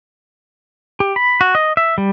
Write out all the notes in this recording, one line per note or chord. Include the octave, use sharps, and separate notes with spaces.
G4
B5
F#4
D#5
E5
G3